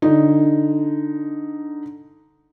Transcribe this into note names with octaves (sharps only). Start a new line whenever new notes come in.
D3 D#4